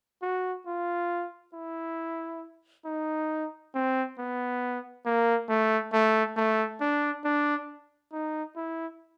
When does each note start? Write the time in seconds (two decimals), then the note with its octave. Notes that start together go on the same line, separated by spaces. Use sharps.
0.22 F#4
0.67 F4
1.54 E4
2.86 D#4
3.74 C4
4.18 B3
5.06 A#3
5.49 A3
5.93 A3
6.37 A3
6.81 D4
7.25 D4
8.12 D#4
8.56 E4